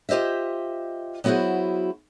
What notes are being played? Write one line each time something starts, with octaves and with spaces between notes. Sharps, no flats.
F4 G4 C5 D#5 E5
F#3 B3 E4 F#4 G#4 C5